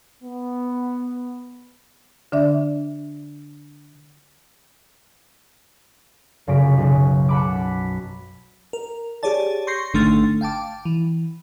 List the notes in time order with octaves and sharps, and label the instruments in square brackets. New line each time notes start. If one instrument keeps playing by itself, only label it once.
[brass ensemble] B3
[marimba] D3 D4 D5 E5
[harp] F1 F#2 C#3 A#6 B6 D7
B1 C#3
F#5 A5 B5 D6
B6
[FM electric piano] A#4
G4 G#4 C#5 D5 A5
C6 C#6 G6 A#6 C7
G#1 D3 A3 C6 F6 A6
F5 G5 A5 D6
E3